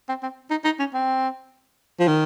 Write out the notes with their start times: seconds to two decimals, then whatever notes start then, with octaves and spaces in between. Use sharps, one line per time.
0.09 C4
0.23 C4
0.50 D#4
0.65 D#4
0.79 C#4
0.94 C4
2.00 F3
2.08 D#3